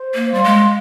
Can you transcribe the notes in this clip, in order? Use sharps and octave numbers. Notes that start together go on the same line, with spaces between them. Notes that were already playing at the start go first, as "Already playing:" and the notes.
Already playing: C5
A#3
G3 F5 C6
G#3